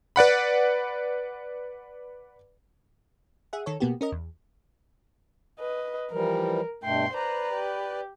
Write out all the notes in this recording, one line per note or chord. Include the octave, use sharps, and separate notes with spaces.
B4 D5 F#5 B5
G#4 E5 F#5
D#3 A4 C#5
B2 A#3 B3 F#4 G4
C#4 A#4 D#5
E2
B4 D#5
E3 F3 G3 A#4
G2 B2 A3 G5 C6
B4 C5 D5 A#5
G4